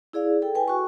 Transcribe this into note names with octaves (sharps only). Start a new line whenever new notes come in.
E4 G#4 D5 F5
A4 G5
B4 G5 G#5
F#4 C#6